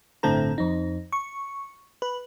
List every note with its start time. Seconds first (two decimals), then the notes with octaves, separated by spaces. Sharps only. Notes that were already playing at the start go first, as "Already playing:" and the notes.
0.23 G1 A2 D3 C4 A4 A#5
0.58 F2 D#4
1.12 C#6
2.02 B4